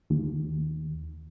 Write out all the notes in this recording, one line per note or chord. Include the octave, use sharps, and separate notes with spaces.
D#2